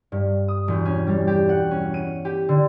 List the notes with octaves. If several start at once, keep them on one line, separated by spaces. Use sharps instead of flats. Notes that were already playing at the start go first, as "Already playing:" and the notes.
G2
D#6
E1
C#4
G3
G4
F#5
C#4
D#7
G4
D3